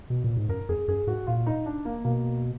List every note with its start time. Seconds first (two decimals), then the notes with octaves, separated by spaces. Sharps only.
0.10 B2
0.24 A#2
0.37 G#2
0.49 F#2 A#4
0.69 F2 G#4
0.88 F#2 G#4
1.07 G#2 F#4
1.27 A#2 F4
1.47 D#4
1.66 D4
1.85 A#3
2.04 B2 A#3